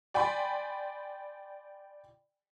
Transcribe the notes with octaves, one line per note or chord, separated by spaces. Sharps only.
D5 G5 G#5 B5 C6